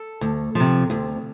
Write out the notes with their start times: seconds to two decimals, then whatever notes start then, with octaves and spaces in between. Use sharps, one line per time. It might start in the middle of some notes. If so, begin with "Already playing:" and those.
Already playing: A4
0.21 D2
0.55 C3 F3
0.90 D2